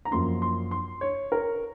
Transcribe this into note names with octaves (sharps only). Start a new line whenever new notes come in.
A#5
F#2 F3 A#3 C#4 C6
C6
C6
C#5
A#4